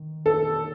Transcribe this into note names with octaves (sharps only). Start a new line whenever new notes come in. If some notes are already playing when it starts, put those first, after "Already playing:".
Already playing: D#3
A4